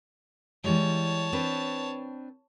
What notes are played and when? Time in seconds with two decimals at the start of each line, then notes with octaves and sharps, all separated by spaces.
0.64 E3 G3 G#3 C#5 A5
1.33 C4 D4 B4